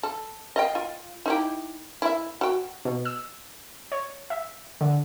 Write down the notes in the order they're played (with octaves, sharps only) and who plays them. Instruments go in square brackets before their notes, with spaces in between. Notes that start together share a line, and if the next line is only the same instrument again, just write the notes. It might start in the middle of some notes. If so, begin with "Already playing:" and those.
[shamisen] A4
D#5 F5 G5
F4
D#4 E4 G4
E4 E5
F#4 G5
[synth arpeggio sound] B2
E6
C#5
E5
D3